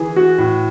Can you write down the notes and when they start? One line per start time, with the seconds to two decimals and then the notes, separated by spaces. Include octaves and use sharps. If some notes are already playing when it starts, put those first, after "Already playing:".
Already playing: E3 G#4
0.16 F#4
0.38 A2